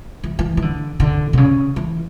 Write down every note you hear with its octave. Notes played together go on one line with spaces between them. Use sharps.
E3
E3
E3
D3
D3
B2
C#3
E3